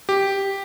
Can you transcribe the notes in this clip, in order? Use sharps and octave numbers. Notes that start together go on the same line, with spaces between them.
G4